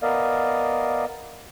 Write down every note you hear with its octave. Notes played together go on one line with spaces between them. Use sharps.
B3 A#4 D5 D#5 F5